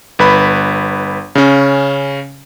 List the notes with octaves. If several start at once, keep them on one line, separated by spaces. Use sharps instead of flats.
G1 B4 B5
C#3 C#4